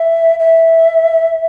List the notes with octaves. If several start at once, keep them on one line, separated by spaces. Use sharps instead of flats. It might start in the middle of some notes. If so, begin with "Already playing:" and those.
Already playing: E5
E5